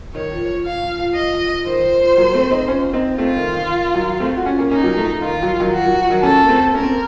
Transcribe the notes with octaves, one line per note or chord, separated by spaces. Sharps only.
D#3 C#5
F3
F3
F3 F5
F3
F3
F3 D#5
F3
F3
D#3 C5
F3
F3
F#3 A#3
A3 C4
C4 D#4
C#4 F4
C4 D#4
A3 C4 F4
D#3
D#3
F3
D#3 F#3
A3 C4
F#4
C#4 F4
A#3 C#4
A#3 C#4 D#4
F#3 A#3
F3 A3
F3
D#3 F4
F3
F#3
F3
D#3 F#3
F3 F#4
D#3 F#3
F3
D#3 F#3
A#3 C#4 A4
A#3
A3 C4
C#4 A#4
C4
A#3